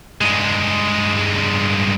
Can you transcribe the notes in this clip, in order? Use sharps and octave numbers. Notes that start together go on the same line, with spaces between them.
G2 G#3